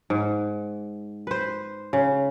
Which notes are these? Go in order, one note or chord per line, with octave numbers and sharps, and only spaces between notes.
G#2
B4 C5
C#3